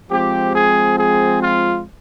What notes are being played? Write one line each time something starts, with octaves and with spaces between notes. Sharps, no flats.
F3 G#3 C4 G4
G#4
G#4
F4